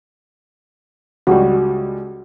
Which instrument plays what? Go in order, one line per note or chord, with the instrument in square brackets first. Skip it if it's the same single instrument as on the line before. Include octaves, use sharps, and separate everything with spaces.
[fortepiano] C#2 G3 [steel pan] F#4